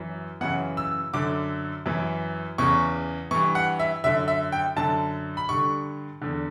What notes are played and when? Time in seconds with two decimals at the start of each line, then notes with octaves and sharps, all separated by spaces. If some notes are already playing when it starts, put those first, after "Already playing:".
Already playing: F#2 E3
0.41 F#2 C#3 E3 F#5
0.77 E6
1.14 F#2 D3 D6
1.86 F#2 E3
2.58 E2 C#3 E3 C#6
3.31 G2 E3 C#6
3.55 F#5
3.80 E5
4.04 F#2 D3 E5
4.28 E5
4.52 G5
4.76 F#2 D3 A5
5.37 B5
5.49 G2 D3 C#6
6.22 E2 D3